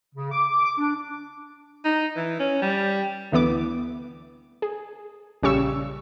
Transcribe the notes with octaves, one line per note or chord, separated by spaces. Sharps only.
C#3
D6
D6
D4
D#4
E3
C#4
G3
D2 E3 B3 D6
G#4
A#1 C#3 G3 C#6 E6